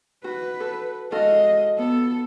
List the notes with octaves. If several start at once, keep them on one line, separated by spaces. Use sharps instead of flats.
F#4 B4
A4
G#3 F#4 A4 D#5 F5
B3 A4